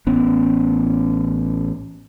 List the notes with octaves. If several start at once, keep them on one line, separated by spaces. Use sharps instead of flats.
A1 B3 C#4